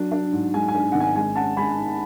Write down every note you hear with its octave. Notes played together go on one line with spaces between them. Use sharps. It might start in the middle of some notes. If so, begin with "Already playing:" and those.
Already playing: F#3 D4
D4
G#2
G#3 G#5
G#5
D4
G#1 F#5
G#5
G#3 G#5
C#4 F#5 A5
G#3 G#5 B5
G#2